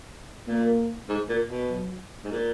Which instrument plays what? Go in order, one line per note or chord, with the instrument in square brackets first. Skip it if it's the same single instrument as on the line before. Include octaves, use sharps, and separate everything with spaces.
[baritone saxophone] A#2 [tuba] A#3
[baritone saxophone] G#2
A#2
B2
[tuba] F#3
[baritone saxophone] G#2
A#2